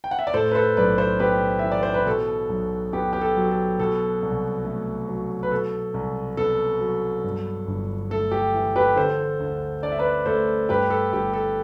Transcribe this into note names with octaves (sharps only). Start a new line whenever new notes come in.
G5
F#5
E5
D5
A2 A4 C5
B4
A4 C5
B1 B4 D5
A4 C5
B3 G4 B4
E3 E5
D5
C5
B4
B2 A4
B1
B3 G4
G4
A4
F#3
A4
B2 A4
C2
A3
F#3
B4
B2 A4
C2
B3 A4
F#3
G2
G1
A3 A4
G4
E3
G4 B4
D3 A4 C5
D2
D4 D5
E5
B4 D5
A3 A4 C5
G2 G4 B4
A4
G1 G4
A4